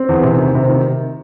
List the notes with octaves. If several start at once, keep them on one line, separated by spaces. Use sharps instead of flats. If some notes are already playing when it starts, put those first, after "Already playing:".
Already playing: C4
E2
C3
D#3
C3
D#3